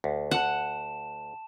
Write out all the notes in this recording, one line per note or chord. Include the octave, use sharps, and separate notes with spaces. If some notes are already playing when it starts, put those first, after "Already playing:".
D2
F#5 A5 E7